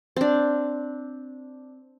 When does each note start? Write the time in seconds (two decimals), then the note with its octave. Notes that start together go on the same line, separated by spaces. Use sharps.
0.16 C4 D4